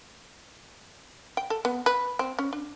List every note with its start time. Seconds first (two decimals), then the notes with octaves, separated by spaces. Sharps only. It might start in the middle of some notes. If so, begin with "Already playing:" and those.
1.37 G5
1.50 A4
1.65 B3
1.86 B4
2.19 C4
2.39 C#4
2.53 D4